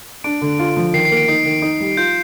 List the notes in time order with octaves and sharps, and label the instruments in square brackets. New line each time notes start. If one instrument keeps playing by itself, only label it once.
[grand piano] D4 [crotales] D7
[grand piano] D3
F4
F3
[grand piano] D#3 [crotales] C7
[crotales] C7
[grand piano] A#3
[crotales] D7
[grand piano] D#4 [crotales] C7
[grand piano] D#3
D#4
G3
[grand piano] F4 [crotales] G6